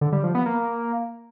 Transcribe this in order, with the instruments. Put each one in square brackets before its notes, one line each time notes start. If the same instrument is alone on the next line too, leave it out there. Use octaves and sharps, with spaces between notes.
[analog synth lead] D3
G3
F3
B3
A#3